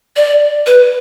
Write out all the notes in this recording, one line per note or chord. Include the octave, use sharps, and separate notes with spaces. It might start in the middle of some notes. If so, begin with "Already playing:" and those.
D5
B4